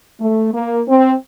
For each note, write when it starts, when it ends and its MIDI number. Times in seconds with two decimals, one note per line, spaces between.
0.20 0.52 57
0.54 0.81 58
0.88 1.13 60